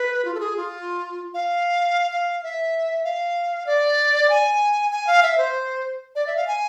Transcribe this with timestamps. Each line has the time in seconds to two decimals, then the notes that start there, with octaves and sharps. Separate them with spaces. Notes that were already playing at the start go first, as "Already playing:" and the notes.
Already playing: B4
0.25 F4
0.34 A4
0.40 G#4
0.57 F4
1.34 F5
2.11 F5
2.43 E5
3.04 F5
3.66 D5
4.30 G#5
4.91 G#5
5.07 F5
5.23 E5
5.38 C5
6.15 D5
6.27 E5
6.36 F5
6.47 G#5